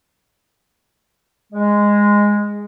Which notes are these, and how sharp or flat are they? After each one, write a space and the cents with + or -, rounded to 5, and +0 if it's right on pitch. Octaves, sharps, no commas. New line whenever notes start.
G#3 -10